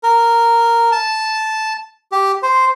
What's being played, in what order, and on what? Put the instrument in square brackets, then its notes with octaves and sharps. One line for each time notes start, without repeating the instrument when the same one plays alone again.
[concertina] A#4
A5
G4
C5